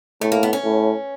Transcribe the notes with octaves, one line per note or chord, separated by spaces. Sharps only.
A2 A3
A#3
B3
C#4
A2